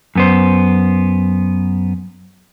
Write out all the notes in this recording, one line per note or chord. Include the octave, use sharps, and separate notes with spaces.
F#2 B3 C5